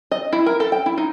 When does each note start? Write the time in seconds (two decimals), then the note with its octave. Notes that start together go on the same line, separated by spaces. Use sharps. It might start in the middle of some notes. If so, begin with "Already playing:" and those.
0.11 D#5
0.33 E4
0.46 A#4
0.60 A4
0.72 G5
0.86 E4
0.98 D#4